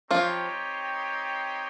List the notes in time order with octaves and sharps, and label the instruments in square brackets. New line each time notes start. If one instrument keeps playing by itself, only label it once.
[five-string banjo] F3 F4 [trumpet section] C4 D#4 G4 C#5 G5